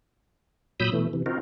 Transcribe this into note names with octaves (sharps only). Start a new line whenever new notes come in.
A#2 F#3 B5 D#6 E6 G6
B2 E3 A3
C3 E3
C4 D#4 F4 F#4 A#4